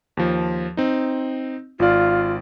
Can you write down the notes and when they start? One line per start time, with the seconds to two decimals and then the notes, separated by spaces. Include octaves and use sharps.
0.17 D#2 F3
0.77 C4 D#4
1.79 G#1 F4 D5